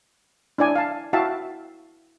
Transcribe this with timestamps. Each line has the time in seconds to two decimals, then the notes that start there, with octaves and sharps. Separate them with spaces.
0.58 D4 E4 D5 G#5
0.76 F5 A5
1.13 E4 F#4 E5 F5 G5 A5